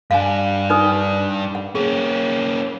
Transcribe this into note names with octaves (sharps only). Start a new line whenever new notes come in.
G2 D4 F5 G#5
D#4 B4 D#6
F#5
A#3 C#4 G#4